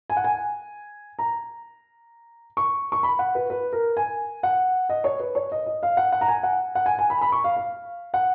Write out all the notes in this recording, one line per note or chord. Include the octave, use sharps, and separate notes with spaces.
G#5
F#5
G#5
A#5
C#6
C#6
B5
F#5
B4
B4
A#4
G#5
F#5
D#5
C#5
B4
C#5
D#5
D#5
F5
F#5
F#5
A#5
G#5
F#5
F#5
G#5
G#5
B5
B5
C#6
F5
F5
F#5